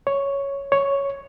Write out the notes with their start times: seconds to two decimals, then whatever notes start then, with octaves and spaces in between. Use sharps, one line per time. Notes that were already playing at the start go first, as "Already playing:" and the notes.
0.07 C#5
0.72 C#5